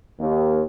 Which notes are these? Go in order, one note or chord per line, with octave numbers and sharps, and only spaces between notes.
D#2